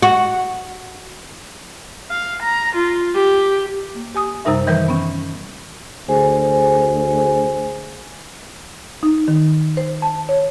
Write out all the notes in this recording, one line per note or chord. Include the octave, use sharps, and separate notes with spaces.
F#4
F5
A#5
F4
G4
A#3
G4 G#5 D#6
F#2 C3 G3 D#4 A#4 E5
D#3 E3 G3 A#4 B4 G6
B3 C#4
D2 G#4 C5 G#5
D#4
D#3
C5
A5
C#5